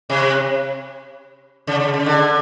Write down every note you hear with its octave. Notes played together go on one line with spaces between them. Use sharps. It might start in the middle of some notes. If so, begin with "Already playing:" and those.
C3
C#3
C#3
C#3
D3